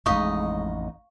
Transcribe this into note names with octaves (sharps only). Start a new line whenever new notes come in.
A1 F2 A2 G#3 D#4 D#5 F5 C#6